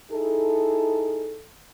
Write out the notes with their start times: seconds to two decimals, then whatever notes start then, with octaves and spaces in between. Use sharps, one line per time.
0.10 D#4 E4 G#4 A4